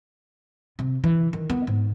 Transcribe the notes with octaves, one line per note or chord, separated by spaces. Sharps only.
C3
E3
D#3
B3
G#2